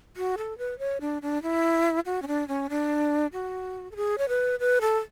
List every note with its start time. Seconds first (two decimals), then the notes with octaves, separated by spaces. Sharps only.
0.17 F#4
0.38 A4
0.58 B4
0.79 C#5
1.01 D4
1.22 D4
1.43 E4
2.06 F#4
2.22 C#4
2.28 D4
2.48 C#4
2.70 D4
3.33 F#4
3.91 A4
3.96 G#4
4.18 C#5
4.29 B4
4.60 B4
4.81 A4